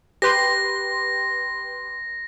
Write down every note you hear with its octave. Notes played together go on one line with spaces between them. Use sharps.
G4 B4 C6 A#6